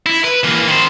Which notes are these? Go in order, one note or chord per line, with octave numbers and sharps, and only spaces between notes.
E4
B4
E3 A#3
D#3 C5